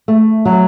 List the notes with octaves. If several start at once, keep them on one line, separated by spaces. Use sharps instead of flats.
A3
F#3